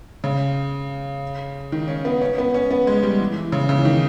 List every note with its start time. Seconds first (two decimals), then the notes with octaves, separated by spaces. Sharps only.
0.24 C#3
1.72 D#3
1.88 C#4
2.05 B3
2.21 C#4
2.38 B3
2.54 C#4
2.71 B3
2.87 G#3
3.03 G3
3.20 E3
3.36 E3
3.52 C#3
3.69 C#3
3.78 E3
3.85 D#3